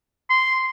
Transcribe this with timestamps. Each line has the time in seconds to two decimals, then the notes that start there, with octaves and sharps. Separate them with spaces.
0.30 C6